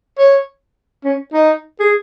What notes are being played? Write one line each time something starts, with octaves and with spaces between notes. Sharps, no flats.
C#5
C#4
D#4
G#4